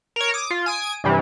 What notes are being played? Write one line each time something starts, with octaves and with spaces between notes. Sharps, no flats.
A#4 C#5
D6 D#6
F4
G#5 D#6 D7
G2 C3 E3 G3